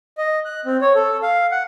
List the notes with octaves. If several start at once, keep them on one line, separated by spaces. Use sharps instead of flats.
D#5
F#6
C4
C#5
A4
F5
F#5